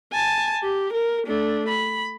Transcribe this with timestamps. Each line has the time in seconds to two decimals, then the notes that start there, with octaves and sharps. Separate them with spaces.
0.13 G#5 A5
0.63 G4
0.93 A#4
1.27 A3 D4
1.69 B5